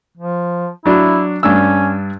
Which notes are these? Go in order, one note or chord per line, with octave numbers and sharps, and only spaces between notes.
F3
F#3 D4 E4
G2 C#4 D4 E6